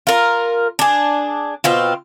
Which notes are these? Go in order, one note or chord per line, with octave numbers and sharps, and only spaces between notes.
F4 A#4
D4 G#4
B2 C4 F4